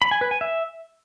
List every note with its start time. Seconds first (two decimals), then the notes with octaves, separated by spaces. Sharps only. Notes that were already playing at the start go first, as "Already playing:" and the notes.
0.02 B5
0.11 G#5
0.21 B4
0.31 G#5
0.41 E5